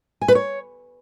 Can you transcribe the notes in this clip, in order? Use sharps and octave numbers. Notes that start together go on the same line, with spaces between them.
G#5
B4
C#5